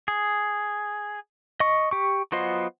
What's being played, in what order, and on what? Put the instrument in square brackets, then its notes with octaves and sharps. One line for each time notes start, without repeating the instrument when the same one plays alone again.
[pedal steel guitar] G#4
D#5 C#6
G4 C#6
F#3 B3 F4 C5 D#5